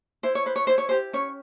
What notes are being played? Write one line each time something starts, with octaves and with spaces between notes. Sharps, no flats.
E4 C5
C#5
B4 C5
C#5
E4 C5
C#5
G4 C5
C#4 C#5